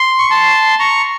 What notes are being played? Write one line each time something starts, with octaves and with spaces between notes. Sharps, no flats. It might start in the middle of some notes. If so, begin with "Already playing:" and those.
Already playing: C6
C#6
A5 C6
A#5 C#6